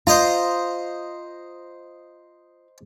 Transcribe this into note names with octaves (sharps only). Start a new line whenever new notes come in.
F4 C5 D#5 A#5